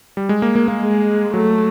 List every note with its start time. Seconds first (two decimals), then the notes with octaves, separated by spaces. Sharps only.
0.17 G3
0.29 G#3
0.42 A#3
0.55 A#3
0.68 A#3
0.82 G#3
1.34 F#3 A3